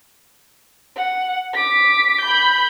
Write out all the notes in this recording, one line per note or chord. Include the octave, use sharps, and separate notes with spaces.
F#5
D6 B6
B5 G6